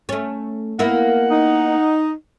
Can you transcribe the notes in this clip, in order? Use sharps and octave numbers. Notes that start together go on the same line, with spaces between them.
A3 C#4
A#3 B3 E4 F#5
D#4